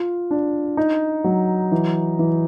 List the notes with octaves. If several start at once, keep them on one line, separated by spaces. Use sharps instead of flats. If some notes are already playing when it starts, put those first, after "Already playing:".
Already playing: F4
D4
D#4
F#3
E3
E3